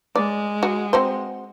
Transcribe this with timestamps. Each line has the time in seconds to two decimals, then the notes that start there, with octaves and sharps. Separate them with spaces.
0.16 G#3 D5
0.63 F#4
0.93 C4 F#4 C5